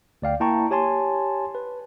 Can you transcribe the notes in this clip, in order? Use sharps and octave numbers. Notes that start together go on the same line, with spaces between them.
D2 D5 F5 G5
A#3 E4 G5 A5 A#5 C#6
G4 C#5 G#5 A5 C6
B4